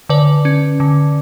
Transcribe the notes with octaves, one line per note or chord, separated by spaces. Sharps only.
D3 B4 D5
C#4
D3